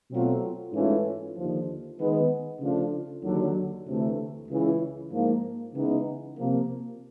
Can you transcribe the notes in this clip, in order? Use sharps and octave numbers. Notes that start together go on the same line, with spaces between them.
B2 F#3 A3 C4 F4
G#2 E3 A3 C#4 F4
D#2 D3 F3
D#3 G#3 B3
C#3 F3 A3 D4 F4
D#2 D3 F#3
D2 C3 E3 A3
C#2 C#3 E3
G#2 F3 A#3
C#3 E3 G#3 B3 D#4
C3 F3 A#3